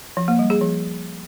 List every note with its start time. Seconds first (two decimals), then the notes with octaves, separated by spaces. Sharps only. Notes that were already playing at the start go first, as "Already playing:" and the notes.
0.17 F3
0.28 A#3
0.39 G3
0.50 G#4
0.61 F3